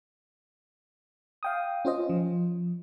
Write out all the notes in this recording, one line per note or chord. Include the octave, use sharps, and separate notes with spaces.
F5 G5 D#6
C#4 F4 C5 D#5
F3